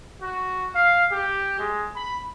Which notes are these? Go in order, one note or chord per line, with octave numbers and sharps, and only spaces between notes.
F#4
F5
G4
G#3
B5